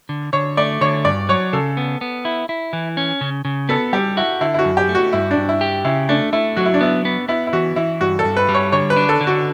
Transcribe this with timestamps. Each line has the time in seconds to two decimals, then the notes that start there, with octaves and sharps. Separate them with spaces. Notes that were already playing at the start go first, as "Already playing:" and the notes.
0.09 D3
0.33 D3 C#5
0.57 A3 D5
0.81 D3 C#5
1.05 G2 D5
1.29 F#3 C#5
1.53 C#3 A4
1.77 B3
2.01 B3
2.25 E4
2.49 E4
2.73 E3
2.97 C#4
3.21 C#3
3.45 C#3
3.69 B3 A4
3.93 G3 G4
4.17 E4 F#4
4.41 D3 E4
4.54 E4
4.59 F#4
4.65 F#2
4.77 G4
4.89 A3
4.95 F#4
5.13 G2 E4
5.31 D4
5.37 G2
5.49 E4
5.61 G4
5.85 C#3 E4
6.09 A3 D4
6.33 A3 E4
6.56 F#3 F#4
6.66 E4
6.74 D4
6.81 B3 E4
7.05 B3
7.28 B3 E4
7.47 E4
7.53 E3 F#4
7.76 E3 E4
8.00 G2 F#4
8.19 A4
8.24 G2
8.37 B4
8.49 G3
8.54 C#5
8.72 D3 C#5
8.90 B4
8.96 D4
9.09 A4
9.21 D3
9.27 F#4